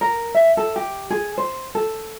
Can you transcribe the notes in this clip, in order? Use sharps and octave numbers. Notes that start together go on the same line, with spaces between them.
A#4
E5
A4
G4
G#4
C5
A4